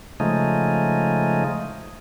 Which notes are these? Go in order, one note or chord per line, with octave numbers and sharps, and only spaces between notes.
C#3 F3 G#3 A3 D#4